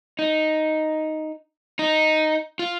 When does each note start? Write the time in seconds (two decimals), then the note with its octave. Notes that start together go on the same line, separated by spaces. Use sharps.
0.19 D#4
1.79 D#4
2.59 F4